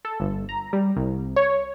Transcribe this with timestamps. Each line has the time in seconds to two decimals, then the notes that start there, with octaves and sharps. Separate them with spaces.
0.05 A4
0.20 G1
0.49 A#5
0.73 G3
0.96 C2
1.36 C#5